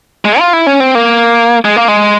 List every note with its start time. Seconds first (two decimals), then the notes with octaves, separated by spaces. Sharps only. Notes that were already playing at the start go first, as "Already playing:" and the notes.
0.25 G#3
0.39 F4
0.53 E4
0.67 C#4
0.80 C4
0.95 A#3
1.65 G#3
1.76 A#3
1.88 G#3